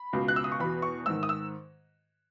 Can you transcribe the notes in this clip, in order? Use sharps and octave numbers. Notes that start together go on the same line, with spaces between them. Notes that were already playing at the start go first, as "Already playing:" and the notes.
Already playing: B5
C#2 B2
F#6
E6
D#6
C#6
E2 B2 B5
C#6
G#2 D#3 E6
D#6
E6